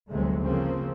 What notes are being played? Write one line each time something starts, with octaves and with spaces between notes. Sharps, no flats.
G1 D2 C3 F#3 G#3 A3
C#3 F3 A#3 C4